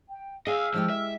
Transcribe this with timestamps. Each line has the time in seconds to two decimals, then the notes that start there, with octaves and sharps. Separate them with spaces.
0.08 G5
0.47 G#4 D#5 F5 E6 F6
0.74 F3 G#3 E4 G4
0.90 E5